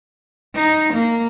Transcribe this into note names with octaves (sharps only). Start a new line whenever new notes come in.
D#4
A#3